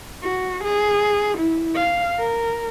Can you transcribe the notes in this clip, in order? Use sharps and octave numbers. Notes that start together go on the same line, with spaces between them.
F#4
G#4
E4
F5
A#4